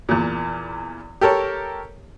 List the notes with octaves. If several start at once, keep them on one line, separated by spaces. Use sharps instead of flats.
E2 A#2
G4 A4 A#4 C#5